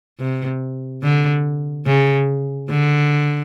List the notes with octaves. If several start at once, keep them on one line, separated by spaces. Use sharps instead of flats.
C3
D3
C#3
D3